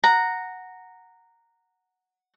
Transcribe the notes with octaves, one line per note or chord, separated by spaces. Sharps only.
F#5 A#5